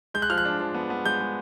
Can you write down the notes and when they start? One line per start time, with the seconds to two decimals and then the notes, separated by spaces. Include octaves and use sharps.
0.14 G#3 G6
0.22 F#6
0.30 F3 F6
0.38 F#6
0.45 D4
0.60 F3
0.74 B3
0.90 B3
1.05 G#3 G6
1.20 G#3